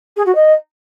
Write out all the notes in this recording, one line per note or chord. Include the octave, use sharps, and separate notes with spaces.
G#4
F#4
D#5